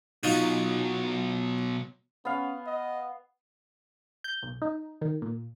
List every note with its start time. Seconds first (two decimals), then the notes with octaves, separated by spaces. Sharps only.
0.23 B2 F#3 D#4 F4 F#4
2.25 B3 C#4 F5
2.66 D#5
4.24 G6
4.43 B1
4.62 D#4
5.01 D#3
5.22 A#2